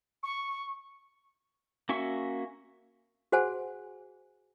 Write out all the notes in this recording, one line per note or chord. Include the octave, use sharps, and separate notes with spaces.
C#6
A#3 C#4 F#4 E5 C#6
F#4 G#4 C5 F#5 G#5 A5